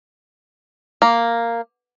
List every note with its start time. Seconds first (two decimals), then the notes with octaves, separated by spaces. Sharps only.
1.02 A#3